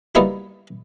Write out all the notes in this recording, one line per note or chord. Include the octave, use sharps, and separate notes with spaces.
G3 A#3 B3 D#4 E4 F#4